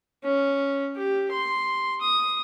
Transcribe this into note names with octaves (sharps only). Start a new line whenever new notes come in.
C#4
G4
C6
D#6